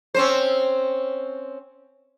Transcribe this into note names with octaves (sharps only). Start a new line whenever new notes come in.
C4 C#4 C5